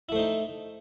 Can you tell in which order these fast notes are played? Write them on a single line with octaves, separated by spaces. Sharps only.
E4 A3 C5 D#4